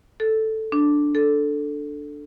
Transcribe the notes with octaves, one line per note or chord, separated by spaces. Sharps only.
A4
D4
A4